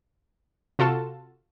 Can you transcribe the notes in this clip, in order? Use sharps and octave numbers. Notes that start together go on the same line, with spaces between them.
C3 F4 F#4 A4 A5